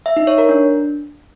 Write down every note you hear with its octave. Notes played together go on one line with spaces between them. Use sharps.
E5
D#4
C#5
A#4
D4